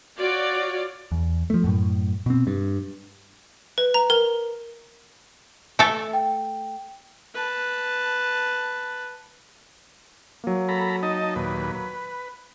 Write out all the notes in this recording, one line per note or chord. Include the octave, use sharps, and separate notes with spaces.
F4 F#4 C#5 D5
E2
F3 A3
F#2 A2
B2 C4
G2
B4
A#5
A#4
A3 A4
G5
B4 A5
F#3 A#3
A4 A#5 B5
D#4 D#5 A5
D#2 A#2 B4
B4